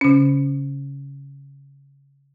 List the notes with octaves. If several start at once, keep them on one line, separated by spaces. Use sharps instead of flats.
C#3 C#4